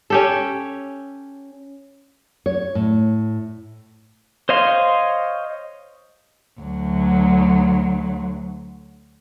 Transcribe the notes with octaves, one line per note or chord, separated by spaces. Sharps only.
C#4 G4 A4
C#5
A2
C5 C#5 D#5 F5 C6
D2 F#3